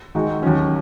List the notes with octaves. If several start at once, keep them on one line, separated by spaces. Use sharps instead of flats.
D#3 G#3 D#4 F#4
D#2 D#3 F#3 C#4